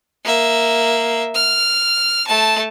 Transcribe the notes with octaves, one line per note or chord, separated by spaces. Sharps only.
A#3 E5
F6
A3 A5